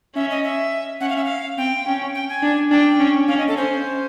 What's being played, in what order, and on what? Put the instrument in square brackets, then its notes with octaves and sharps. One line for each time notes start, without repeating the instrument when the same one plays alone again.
[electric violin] C#4 [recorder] E5
[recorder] D#5
E5
[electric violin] C#4 [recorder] F#5
[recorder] F5
E5
F5
[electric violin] C4 [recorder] G5
[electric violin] C#4
[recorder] G5
G#5
[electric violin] D4
[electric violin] D4 [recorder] G5
[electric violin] C#4
[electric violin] C#4 [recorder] F5
[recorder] D#5
A4
[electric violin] C#4 [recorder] C5